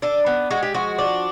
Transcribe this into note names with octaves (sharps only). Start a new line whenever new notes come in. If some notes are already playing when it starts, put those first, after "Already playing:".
D4 A4
B3
G#3 F#4
G4
F3 F#4
D4